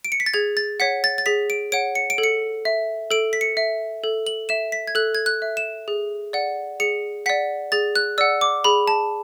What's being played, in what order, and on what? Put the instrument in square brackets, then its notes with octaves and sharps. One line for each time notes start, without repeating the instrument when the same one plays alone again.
[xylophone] D7
C#7
B6
A6
G#4 G#6
A6
C#5 F#5 B6
A6
A6
G#4 B6
D7
C#5 F#5 D7
C#7
D7
A4
C#7
E5
A4 D7
B6
C#7
E5
A4
F#7
E5 E7
B6
G#6
A4 F#6
G#6
F#6
E5
E7
G#4
D5 F#5
G#4 C#7
D5 F#5 B6
G#4 A6
F#6
D5 F#5 E6
D6
G#4 B5
A5